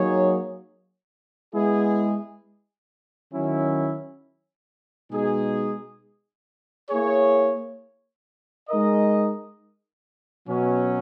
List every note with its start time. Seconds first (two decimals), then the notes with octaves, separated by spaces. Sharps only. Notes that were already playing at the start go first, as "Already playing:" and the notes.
Already playing: F#3 A#3 D#4 G#4 C#5
1.54 G#3 B3 E4 G#4
3.33 D#3 F#3 C#4 E4
5.11 B2 G#3 D#4 G#4
6.90 A#3 E4 G#4 C#5
8.69 G#3 D#4 A#4 D#5
10.47 B2 F#3 C#4